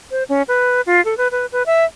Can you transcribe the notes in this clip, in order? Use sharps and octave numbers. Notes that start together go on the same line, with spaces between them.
C5
C#4
B4
F4
A4
B4
B4
B4
E5